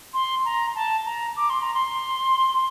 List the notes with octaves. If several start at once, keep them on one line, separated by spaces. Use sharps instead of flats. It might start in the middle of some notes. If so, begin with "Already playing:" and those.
C6
A#5
A5
A#5
D6
C6
A#5
C6